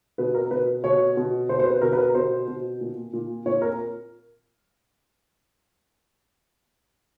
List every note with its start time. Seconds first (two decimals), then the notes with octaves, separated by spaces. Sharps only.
0.18 B2 B4
0.35 A#4
0.51 B2 B4
0.84 B2 C#5
1.17 B2
1.49 B2 C5
1.59 C5
1.66 B4
1.82 B2 A#4
1.93 B4
1.98 A#4
2.15 B2 C5
2.48 B2
2.81 A#2
3.13 A#2
3.46 A#2 C#5
3.62 A#4